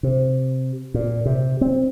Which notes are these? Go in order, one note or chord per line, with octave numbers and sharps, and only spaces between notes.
C3
A#2
C3
C4